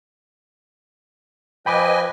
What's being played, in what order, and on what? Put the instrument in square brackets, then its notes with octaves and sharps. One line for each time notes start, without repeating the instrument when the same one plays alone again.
[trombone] F3 [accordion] B4 D#5 G#5 [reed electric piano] G5 B5 D6